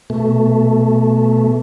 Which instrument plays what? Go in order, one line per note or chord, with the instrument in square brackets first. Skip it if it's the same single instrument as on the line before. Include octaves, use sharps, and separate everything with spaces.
[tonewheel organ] B2 A3